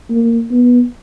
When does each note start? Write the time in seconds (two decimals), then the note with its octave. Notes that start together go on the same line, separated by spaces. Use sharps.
0.10 A#3
0.51 B3